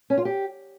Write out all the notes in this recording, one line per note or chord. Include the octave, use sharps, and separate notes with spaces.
C#4
F4
G4